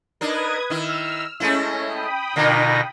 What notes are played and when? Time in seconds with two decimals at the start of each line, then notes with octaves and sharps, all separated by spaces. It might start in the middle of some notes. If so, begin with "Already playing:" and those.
0.21 D4 D#4 A#4 B4 D#6 G#6
0.70 D#3 E4 E6 F6
1.40 G#3 A3 C#4 E4 A#6
1.88 G5 B5 D#6
2.36 B2 D3 A#3 D#4 F4 A#6